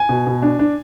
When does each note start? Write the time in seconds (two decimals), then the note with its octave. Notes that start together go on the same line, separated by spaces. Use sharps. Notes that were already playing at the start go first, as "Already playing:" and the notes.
Already playing: G#5
0.09 B2
0.27 B2
0.42 D4
0.59 D4